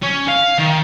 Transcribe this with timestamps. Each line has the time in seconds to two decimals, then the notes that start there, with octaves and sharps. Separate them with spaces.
0.03 C#4
0.28 F5
0.58 D#3